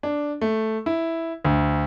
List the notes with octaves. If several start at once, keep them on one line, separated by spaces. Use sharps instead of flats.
D4
A3
E4
D2